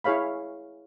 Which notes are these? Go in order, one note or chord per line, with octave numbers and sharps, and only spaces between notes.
E4 G#4 C#5 F5 B5